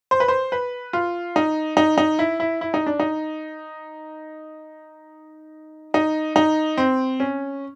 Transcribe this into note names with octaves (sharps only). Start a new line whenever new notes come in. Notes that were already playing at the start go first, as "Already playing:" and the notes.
C5
B4
C5
B4
F4
D#4
D#4
D#4
E4
E4
E4
D#4
D4
D#4
D#4
D#4
C4
C#4